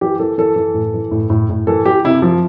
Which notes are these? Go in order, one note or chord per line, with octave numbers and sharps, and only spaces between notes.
E3 G4
E3 A4
E3 A4
E3
A2
E3
A2
A2
A2
E3 A4
E3 G4
C3 E4
F3